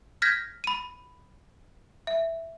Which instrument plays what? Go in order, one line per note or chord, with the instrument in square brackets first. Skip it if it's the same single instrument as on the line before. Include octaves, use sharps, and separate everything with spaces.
[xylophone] F6 G6 G#6 A#6 B6
B5 D#7
E5